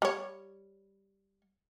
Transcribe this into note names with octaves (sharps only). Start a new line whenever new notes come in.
G3 C#5